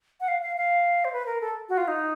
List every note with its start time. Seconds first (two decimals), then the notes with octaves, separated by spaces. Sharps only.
0.20 F#5
0.28 F5
0.42 F5
0.57 F5
1.05 C5
1.13 B4
1.26 A#4
1.41 A4
1.69 F#4
1.78 F4
1.88 D#4